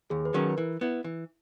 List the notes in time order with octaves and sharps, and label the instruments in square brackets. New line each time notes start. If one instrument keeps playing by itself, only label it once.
[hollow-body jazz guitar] D#2 [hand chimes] G#4
[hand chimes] B4
[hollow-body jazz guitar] D#3 F#3 C#4 [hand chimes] A#4
[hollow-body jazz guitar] E3
B3 E4
E3